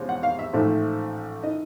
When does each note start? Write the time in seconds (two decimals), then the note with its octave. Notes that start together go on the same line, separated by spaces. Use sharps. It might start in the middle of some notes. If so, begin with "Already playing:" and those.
Already playing: E2 C3 F3 G#3 C#4
0.09 F#5
0.23 F5
0.39 E5
0.53 A1 G#2 F3 A3
1.43 D#3 D#5